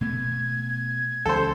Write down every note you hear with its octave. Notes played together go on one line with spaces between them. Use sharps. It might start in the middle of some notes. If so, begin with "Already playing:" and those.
B2 A3 B3 G#6
C#2 E3 C#4 A4 C5